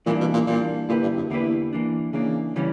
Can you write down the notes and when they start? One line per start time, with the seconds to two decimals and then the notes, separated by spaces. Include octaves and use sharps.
0.06 A#2 E3 G3 A#3 D4
0.20 B2
0.34 A#2
0.47 A#2 E3 G3 A#3 D4
0.89 A#2 D3 A#3 E4 G4 B4
1.03 G2
1.17 F#2
1.30 E2 D3 A#3 E4 G4 B4
1.73 E3 A#3 D4
2.13 C#3 E3 A#3 D4
2.56 C#3 E3 G3 C#4